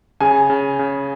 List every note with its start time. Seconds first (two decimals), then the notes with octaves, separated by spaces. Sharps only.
0.20 C#3 G#4 G#5
0.50 C#3
0.79 C#3